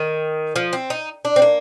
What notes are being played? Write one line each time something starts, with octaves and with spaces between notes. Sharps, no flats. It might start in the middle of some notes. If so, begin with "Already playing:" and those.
Already playing: D#3
F3
C4
D#4
D4
C4
A#3